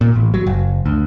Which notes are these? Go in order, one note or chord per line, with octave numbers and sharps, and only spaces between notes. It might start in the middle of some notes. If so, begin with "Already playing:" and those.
A#2
A1
F#3
F#1
D2